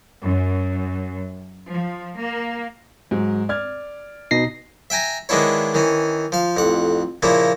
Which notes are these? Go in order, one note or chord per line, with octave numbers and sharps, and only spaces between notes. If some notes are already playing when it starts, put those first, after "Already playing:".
F#2
F3
A#3
G#2 F#3
D5 F6 G#6
B2 D#4 A#6 C7
E5 G5 G#5 A#5
D#3 G#3 B3 D4 E4 C#5
D#3 E3 C#4
F3 F5
A1 F2 F#5
A#2 C#3 F3 A#3 E4